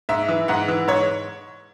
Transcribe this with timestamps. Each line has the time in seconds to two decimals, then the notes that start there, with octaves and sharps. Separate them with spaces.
0.09 G#2 E5
0.29 E3
0.48 G#2 F#5
0.68 E3
0.87 G#2 C#5